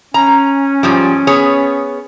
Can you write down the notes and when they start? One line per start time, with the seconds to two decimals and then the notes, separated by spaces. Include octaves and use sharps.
0.14 C#4 A#5
0.83 G#2 F3 G3
1.27 B3 G#4 C#5